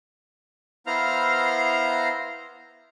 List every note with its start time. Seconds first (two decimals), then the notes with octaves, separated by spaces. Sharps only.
0.87 B3 E4 C5 F5 A#5 F6